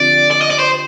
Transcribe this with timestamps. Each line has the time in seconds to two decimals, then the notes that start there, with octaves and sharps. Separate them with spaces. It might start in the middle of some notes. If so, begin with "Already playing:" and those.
Already playing: D3 F3 C4 G4 D5
0.31 D5
0.41 D#5
0.51 D5
0.59 C5